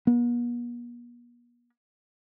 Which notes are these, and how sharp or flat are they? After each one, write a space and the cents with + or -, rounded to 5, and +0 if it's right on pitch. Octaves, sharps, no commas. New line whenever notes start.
B3 -45